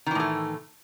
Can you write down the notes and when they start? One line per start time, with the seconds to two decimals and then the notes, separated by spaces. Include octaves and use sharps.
0.06 D#3
0.11 E3
0.15 A2
0.20 A3